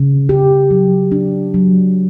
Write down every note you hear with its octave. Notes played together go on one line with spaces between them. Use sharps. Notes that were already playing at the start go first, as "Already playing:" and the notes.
Already playing: C#3
C#3 G4
F#3
D4
F#3